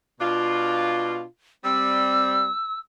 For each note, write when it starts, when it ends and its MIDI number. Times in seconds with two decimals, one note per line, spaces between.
0.20 1.25 47
0.20 1.25 62
0.20 1.25 65
1.64 2.49 55
1.64 2.49 60
1.64 2.78 88